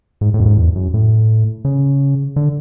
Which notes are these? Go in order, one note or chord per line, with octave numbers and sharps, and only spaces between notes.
G#2
A2
F#2
G#2
E2
F#2
A2
C#3
D3